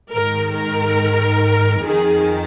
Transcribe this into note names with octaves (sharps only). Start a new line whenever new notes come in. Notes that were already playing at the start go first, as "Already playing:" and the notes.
G#2 D#3 A#4
A#4
F2 D#3 G#4